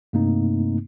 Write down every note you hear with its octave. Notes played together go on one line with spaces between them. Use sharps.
G2 C3 A3 A#3 C4 D#4